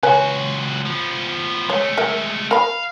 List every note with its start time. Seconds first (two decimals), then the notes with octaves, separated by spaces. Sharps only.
0.03 C#2 F#4 B4 C#5 G#5
0.86 F3 B3
1.70 G#3 A3 C#5
1.98 A#4 E5
2.51 A#4 F5 B5